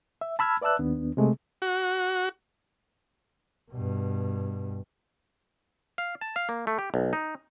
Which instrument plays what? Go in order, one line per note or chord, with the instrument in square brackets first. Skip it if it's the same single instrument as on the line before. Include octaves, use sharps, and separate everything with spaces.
[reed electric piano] E5
A5 B5 E6 F6 G#6
B4 D5 E5 A5 E6 F#6
D#2 B3 D4
C3 G#3 A3
[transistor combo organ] F#4
[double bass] G2 B2
[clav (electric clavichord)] F5
A5
F5
A#3
A3
G4
B1
D#4